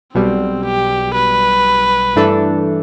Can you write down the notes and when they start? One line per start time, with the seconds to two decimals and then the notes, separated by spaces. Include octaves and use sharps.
0.14 B1 B2 G3 C4
0.65 G4
1.15 B4
2.16 G2 E3 A3 D4 A4